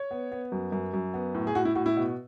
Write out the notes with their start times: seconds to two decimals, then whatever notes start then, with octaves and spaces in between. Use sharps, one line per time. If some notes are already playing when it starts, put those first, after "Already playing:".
Already playing: C#5
0.11 B3
0.32 B3
0.52 F#2
0.72 F#2
0.93 F#2
1.14 B3
1.35 A2
1.47 G#4
1.55 A2 F#4
1.65 E4
1.75 A2 F#4
1.86 E4
1.96 B2